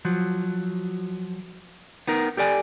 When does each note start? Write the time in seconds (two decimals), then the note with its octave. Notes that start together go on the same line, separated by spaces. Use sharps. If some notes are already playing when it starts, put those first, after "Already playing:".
0.05 F3 F#3
2.08 B3 D#4 A#4
2.37 G4 A4 D5 G#5